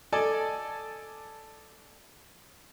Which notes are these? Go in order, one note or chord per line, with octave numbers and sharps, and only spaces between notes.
A4 D5 D#5 G#5 A5 D6